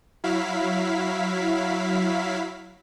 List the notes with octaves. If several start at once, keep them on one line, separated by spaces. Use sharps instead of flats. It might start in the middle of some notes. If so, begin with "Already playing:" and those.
F#3 E4 F5 B6